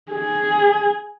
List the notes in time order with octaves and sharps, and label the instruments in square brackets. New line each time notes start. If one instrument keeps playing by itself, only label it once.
[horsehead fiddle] G#4